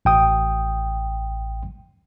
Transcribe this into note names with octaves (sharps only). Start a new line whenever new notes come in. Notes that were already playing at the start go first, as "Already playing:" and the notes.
A1 G5 D#6